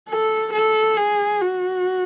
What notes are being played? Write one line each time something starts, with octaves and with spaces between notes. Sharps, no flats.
A4
A4
G#4
F#4